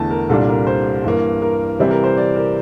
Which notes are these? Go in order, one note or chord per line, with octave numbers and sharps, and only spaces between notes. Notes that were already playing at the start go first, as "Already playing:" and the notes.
Already playing: E2 D3 A3 E4 A5
A#4
C2 A#2 G3 D4 A4
A#4
C5
G2 E3 A#3
A#4
C3 E3 G3 C4 E4
A#4
C5
D5
A#4